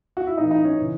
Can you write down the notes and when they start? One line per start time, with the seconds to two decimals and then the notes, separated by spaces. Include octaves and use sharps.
0.17 F#4
0.27 E4
0.37 A2 E3 D#4
0.51 D#4
0.65 C#4
0.77 C#3 E3